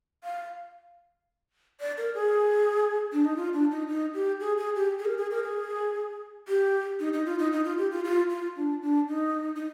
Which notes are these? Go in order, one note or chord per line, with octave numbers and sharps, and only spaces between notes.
F5
D5
A#4
G#4
D4
D#4
F4
D4
D#4
D#4
G4
G#4
G#4
G4
G#4
A#4
G#4
A#4
G#4
G4
D#4
D#4
F4
D#4
D#4
F4
G4
F4
F4
F4
D4
D4
D#4
D#4